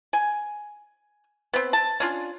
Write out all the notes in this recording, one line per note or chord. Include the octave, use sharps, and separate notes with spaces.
G#5
B3 C4
A5
C#4 D4 F4